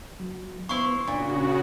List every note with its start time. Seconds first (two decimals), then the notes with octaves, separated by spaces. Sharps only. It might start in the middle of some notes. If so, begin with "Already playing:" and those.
0.20 F#3
0.69 B3 E4 C5 F5 C6 C#6
1.07 A#2 C#3 D4 F#4